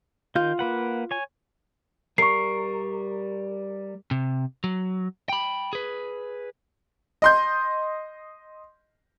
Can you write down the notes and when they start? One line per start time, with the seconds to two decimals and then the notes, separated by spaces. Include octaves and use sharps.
0.35 D#3 F4 G6
0.59 A#3 B4 F#5
1.11 C#5 G#5
2.18 G3 A#4 C#6 C7
4.11 C3
4.64 F#3
5.29 G5 B5
5.73 G#4 B4
7.22 D#5 C6 G6